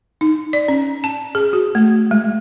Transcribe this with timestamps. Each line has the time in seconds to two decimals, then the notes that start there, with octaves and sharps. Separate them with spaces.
0.21 D#4
0.53 D5
0.68 C#4
1.04 A5
1.35 G#4
1.53 F#4
1.75 A3
2.11 G#3